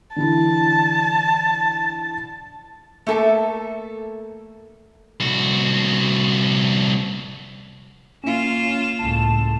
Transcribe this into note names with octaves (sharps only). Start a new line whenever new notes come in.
D3 E3 E4 A5
A3 A#3 A4 E5 A5
C2 F#4
A#3 C#4 F4 E7
C#2 A2 A5